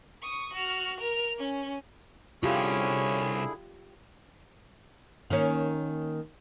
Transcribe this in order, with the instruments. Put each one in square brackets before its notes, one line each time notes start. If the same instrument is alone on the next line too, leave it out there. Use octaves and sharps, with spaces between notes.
[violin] C#6 D#6
F#4 F6
A#4 F7
C#4
[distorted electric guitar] C2 [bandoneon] D3 E4 G#4 [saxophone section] C#4 [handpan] F4 G4
[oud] D#3 A#3 C#4